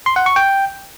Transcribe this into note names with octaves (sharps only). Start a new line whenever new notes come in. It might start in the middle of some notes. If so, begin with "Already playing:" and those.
C6
F#5
C#6
G5